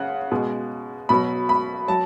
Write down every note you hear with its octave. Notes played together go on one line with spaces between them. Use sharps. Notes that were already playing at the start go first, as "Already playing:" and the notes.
Already playing: C#3 F#5
B2 G#3
B2 F#3 B5
B5
F#3 A5